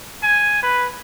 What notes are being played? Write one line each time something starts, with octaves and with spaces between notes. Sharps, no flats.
G#5
B4